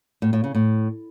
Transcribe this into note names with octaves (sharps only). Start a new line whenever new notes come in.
A2
A2
C#3
A2